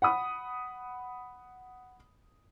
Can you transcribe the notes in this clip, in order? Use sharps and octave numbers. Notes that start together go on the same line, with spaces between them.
F#5 B5 D#6